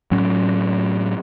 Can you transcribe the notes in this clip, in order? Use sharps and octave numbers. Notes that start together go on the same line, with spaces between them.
A2 F#3 C#4